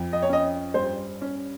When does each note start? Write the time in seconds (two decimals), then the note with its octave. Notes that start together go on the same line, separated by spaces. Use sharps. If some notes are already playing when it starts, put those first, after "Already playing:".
Already playing: F2
0.13 D#5
0.22 C#5
0.29 C#4 D#5
0.74 G2 C5
1.21 C#4